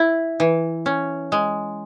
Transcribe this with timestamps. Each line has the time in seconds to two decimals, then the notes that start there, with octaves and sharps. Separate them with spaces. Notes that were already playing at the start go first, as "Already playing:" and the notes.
Already playing: E4
0.40 E3
0.86 C#4
1.32 G#3